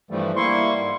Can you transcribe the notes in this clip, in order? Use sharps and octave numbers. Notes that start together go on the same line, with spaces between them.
G2 E3 F3 G3 A3
G3 A#3 E4 C6 C#6
G#2